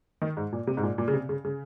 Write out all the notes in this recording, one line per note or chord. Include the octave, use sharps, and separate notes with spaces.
D#3
G#2
A#2
C3
G#2
A#2
A#2
C#3
C3
C#3
C#3